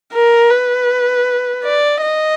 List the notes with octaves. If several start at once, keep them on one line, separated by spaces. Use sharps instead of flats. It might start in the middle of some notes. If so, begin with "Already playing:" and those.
A#4
B4
D5
D#5